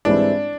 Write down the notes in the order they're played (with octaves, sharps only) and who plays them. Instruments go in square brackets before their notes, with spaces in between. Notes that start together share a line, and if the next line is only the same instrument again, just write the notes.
[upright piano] G#2 E3 G3 C4 E4 [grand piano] D4